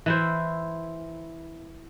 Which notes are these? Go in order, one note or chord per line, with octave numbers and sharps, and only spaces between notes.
E3 E4 C5